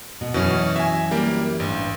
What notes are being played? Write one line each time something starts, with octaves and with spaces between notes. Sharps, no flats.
B2
F#2 B2 E3 C#4
E5 G#5
G3 A#3
A1 G2